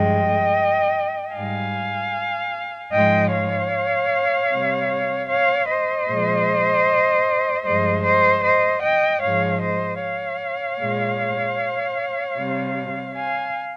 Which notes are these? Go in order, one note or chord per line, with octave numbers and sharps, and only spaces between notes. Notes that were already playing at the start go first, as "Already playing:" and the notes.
Already playing: G2 F3 G#3 D#5 G5
G#2 G3 F5 G#5
G#2 F3 G#3 D#5 G5
C#5 F5
C3 G3
C#5 F5
C5 D#5
A#2 F3 G#3
G2 F3 G#3 C5 D#5
C5 D#5
C5 D#5
D#5 G5
G#2 F3 G#3 C#5 F5
C5 D#5
C#5 F5
A#2 G#3
C3 G3
F5 G#5